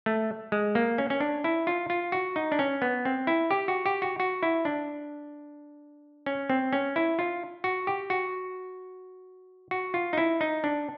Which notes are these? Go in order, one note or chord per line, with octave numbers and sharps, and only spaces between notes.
A3
G#3
A#3
C#4
C#4
D4
E4
F4
F4
F#4
D#4
D4
C#4
B3
C4
E4
G4
F#4
G4
F#4
F#4
E4
D4
C#4
C4
C#4
E4
F4
F#4
G4
F#4
F#4
F4
D#4
E4
D#4
D4